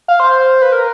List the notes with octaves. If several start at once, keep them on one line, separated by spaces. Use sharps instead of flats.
F5
C5
B4
A#4